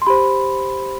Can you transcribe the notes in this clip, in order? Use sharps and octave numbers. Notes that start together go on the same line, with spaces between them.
C6
G4 C5 B5